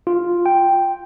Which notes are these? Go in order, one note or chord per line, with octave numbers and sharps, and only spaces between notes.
F4
G5